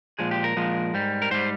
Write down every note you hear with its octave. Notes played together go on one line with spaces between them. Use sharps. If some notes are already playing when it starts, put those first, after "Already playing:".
A#2 F3 G#3 G#4
G4
A#4
A#2 F3 G#3
G#2 G3
A#4
G#2 G3 C5